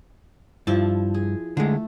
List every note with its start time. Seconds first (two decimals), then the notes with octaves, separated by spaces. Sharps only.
0.67 G2 F3 E4 A5
1.14 G#4
1.57 D3 G#3 A3